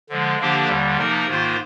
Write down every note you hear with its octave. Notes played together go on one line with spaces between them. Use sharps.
D3 F3 G#3
D3 F3 A#3 D4 G4
D#2 D3 G3
C3 F3 A#3 D#4 A#4
G#2 D#3 A#3 F4 C5